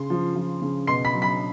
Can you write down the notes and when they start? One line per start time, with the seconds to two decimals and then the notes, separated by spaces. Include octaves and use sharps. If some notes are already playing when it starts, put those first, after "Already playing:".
Already playing: C#3 C6
0.10 F3
0.36 F3
0.62 C#3
0.87 B2 C6 C7
1.05 B5 B6
1.14 F#3
1.22 B5 B6